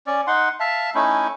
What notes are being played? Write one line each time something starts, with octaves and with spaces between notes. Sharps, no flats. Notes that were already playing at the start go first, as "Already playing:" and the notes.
C#4 D5
D#4 F#5 C6
E5 F5 A5
A3 C#4 D#4 E4